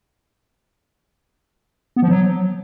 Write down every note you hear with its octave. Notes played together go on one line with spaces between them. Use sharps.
B3
F3
F#3